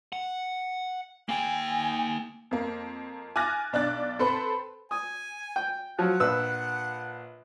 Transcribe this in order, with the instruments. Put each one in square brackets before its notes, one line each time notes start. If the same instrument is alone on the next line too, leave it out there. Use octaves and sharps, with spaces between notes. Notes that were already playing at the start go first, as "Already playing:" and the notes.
[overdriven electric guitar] F#5
[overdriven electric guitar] A#3 G5 [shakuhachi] G#5
[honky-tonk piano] F2 A#3
G#5 D6 F6 F#6 A6 A#6
B1 D4 D5 F#6 A6
C4 A4 B4 C5 B5
[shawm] G#5 [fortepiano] D#6
[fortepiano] G5
[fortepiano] F3 F#3 [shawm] F#5
[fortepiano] A#1 B4 E6